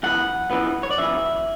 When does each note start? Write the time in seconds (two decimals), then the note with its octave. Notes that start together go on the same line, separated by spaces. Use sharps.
0.03 F#2 E3 B3 F#5
0.51 F#2 E3 B3
0.83 C#5
0.91 D5
0.98 F#2 E3 B3 E5